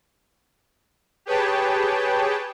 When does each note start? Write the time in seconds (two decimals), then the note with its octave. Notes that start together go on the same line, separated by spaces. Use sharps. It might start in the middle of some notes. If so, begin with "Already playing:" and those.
1.26 G4 G#4 B4 C#5 G5 A5